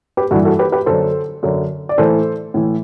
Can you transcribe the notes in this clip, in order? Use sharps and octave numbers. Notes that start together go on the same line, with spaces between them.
G4 B4
G2 E3 F#4 A4
F#4 A4
G4 B4
G4 B4
F#2 D3 A4 C5
F#2 D3
D5
A2 E3 A4 C5
A2 E3